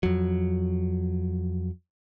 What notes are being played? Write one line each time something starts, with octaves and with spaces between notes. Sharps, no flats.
F2 F#3